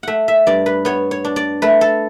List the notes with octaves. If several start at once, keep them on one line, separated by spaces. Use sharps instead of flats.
A3 E5 F#5
E5
G2 D5
B4
B3 C#5
C#5
D4
D5
A3 B4
A4